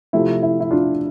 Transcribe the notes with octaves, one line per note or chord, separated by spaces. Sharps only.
C3 F3 A3 E4
E4
E4
D4 F4